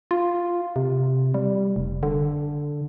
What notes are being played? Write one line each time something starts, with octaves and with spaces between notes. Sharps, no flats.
F4
C3
G3
F1
D3